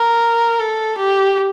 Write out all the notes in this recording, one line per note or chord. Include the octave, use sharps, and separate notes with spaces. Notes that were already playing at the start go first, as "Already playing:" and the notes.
Already playing: A#4
A4
G4